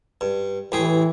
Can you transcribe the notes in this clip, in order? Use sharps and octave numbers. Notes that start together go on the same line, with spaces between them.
G2
A1 E3 G4 G#4